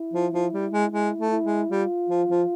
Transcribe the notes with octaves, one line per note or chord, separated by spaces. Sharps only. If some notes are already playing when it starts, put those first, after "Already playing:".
Already playing: E4
F3
F3
G3
G#3
G#3 E4
A3
E4
G#3
G3 F4
F3
F3